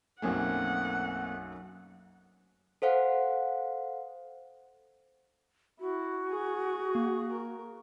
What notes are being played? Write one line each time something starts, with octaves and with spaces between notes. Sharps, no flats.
B1 F#2 A3 A#3 C4 F#5 G#5
A4 C5 F5 F#5
E4 F#4
G#4 G#5
A#3
A#4